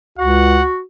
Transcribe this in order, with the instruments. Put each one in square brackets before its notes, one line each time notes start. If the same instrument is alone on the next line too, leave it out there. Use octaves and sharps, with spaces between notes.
[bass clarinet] C#2 [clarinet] F#4 [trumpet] F#5